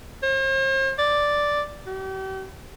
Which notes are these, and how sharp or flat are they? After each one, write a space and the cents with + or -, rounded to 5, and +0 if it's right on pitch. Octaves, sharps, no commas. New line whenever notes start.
C5 +45
D5 +0
G4 -40